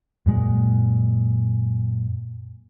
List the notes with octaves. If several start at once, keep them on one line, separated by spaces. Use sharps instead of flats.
F#2 A#2 G#3